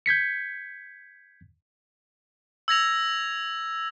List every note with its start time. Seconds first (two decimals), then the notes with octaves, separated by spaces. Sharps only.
0.06 G6 G#6 B6 C#7
2.68 E6 G#6 A#6 F7